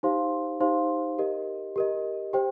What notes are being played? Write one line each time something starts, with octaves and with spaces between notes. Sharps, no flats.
D#4 G4 C5 F5 C6
D#4 G4 C5 F5 C6
G4 A#4 D#5
G4 A#4 D#5
G4 C5 G5